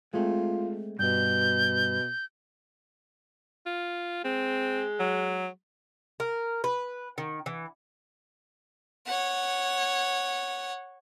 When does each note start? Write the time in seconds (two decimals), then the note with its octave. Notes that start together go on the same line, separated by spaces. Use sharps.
0.14 G#3 A3 C4 F4
0.99 G2 B2 G6
3.66 F4
4.24 G#3 C4
5.00 F#3
6.20 A#4
6.64 B4
7.18 D#3
7.46 E3
9.06 C#5 F#5